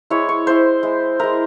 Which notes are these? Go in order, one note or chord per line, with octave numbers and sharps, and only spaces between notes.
G#3 E4 C#5
C#5
G#3 E4 C5
G#3 E4
G#3 E4 A#4